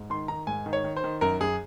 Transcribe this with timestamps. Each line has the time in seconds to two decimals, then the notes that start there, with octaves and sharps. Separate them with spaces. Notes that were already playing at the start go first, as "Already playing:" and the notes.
Already playing: G#2
0.10 D#3 C6
0.28 D#3 A#5
0.47 G#2 G#5
0.66 D#3
0.73 C#5
0.84 D#3
0.97 C5
1.04 D#3
1.21 F#2 A#4
1.40 F#2 G#4